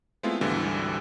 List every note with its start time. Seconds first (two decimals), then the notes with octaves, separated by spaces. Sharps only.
0.23 G#3 A3 B3 C4 E4 F4
0.41 G#1 D2 D3 E3 G3